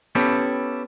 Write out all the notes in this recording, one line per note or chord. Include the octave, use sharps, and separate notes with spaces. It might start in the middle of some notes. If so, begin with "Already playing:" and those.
B3 C#4 E4 G4 A4